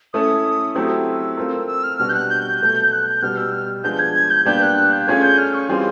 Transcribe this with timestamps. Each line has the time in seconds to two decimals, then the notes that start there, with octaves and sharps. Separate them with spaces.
0.13 A3 C#4 E4 A4 D#6
0.75 F#3 A3 C4 E4 G4 E6
1.37 A3 C4 F4 A#4
1.68 E6
1.83 F6
1.98 B2 G3 B3 D4 F#4 F6
2.09 G6
2.14 F#6
2.30 G6
2.61 B2 F#3 A3
2.91 F#6
3.07 G6
3.22 B2 G3 B3 F6
3.37 E6
3.53 F6
3.84 F3 G#3 B3 D4 G6
3.99 G#6
4.14 G#6
4.30 G6
4.45 A#2 G3 B3 D4 G4 G6
4.62 F#6
4.77 F#6
4.92 G6
5.07 A3 C#4 F4 G#4 G#6
5.23 G6
5.38 F6
5.54 C#6
5.69 E3 G3 C4 F4 G#4 C6